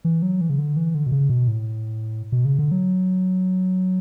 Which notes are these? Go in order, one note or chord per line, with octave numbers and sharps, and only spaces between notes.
E3
F#3
E3
C#3
D3
E3
D3
B2
C#3
B2
A2
B2
C#3
D3
F#3